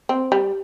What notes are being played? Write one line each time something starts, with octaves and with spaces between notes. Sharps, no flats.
C4
G3